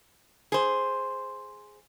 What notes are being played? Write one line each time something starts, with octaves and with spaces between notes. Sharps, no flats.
G#4 C5